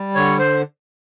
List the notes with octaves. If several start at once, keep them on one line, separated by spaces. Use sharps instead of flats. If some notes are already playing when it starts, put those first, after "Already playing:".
Already playing: G3
D3 C#5
C5